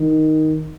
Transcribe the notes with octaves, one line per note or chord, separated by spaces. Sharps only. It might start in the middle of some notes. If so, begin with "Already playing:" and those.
Already playing: D#3